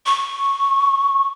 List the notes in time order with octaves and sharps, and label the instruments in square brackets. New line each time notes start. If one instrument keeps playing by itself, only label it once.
[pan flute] C#6